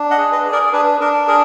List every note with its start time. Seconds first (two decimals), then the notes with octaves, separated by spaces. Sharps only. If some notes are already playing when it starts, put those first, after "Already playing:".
Already playing: D4
0.11 D#5 F#5
0.18 G#4
0.32 B4 D#5
0.45 G#4
0.52 A#4 D5
0.73 D4 G#4 B4
1.00 D4 A#4
1.28 G#4 A#4